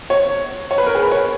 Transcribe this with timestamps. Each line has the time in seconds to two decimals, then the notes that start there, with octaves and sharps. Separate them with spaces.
0.10 C#5
0.71 C#5
0.78 B4
0.86 A#4
0.95 G#4
1.03 B4
1.11 C#5